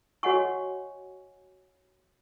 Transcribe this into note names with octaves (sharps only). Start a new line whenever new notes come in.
F#4 C#5 D#5 F#5 G#5 C#6